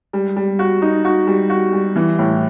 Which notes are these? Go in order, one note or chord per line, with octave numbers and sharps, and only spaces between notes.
G3
G3
F#4
D#4
F#4
G3
F#4
G3
E3
A2